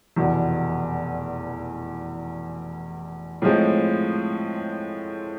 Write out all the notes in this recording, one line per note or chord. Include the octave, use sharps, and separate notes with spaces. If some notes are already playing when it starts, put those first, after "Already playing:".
F1 E2 B2
A2 F3 G#3 C4